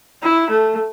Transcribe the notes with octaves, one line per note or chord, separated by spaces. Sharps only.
E4
A3